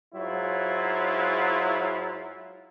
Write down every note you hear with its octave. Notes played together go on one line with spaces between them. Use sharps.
G#2 F#3 E4 F4